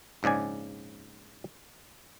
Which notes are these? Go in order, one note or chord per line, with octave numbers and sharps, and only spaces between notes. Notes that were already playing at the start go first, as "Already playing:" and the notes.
A#1 G#2 C#3 D5 G#5